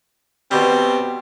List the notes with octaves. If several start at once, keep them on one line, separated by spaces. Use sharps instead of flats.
B2 G3 C4